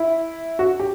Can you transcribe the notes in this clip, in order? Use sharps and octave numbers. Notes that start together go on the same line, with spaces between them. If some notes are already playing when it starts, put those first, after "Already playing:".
Already playing: E4
F#4
G4